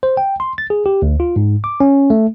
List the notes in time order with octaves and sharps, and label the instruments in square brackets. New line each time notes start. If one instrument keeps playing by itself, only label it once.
[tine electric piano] C5
G5
C6
A6
G#4
G4
D2
F4
G#2
D6
C#4
A3